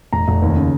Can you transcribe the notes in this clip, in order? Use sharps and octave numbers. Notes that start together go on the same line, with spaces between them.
F1 A#5
F1
D#2
C#3